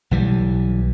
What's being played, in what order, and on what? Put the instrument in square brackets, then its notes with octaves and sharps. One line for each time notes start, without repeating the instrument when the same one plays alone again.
[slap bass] B1 E3 G3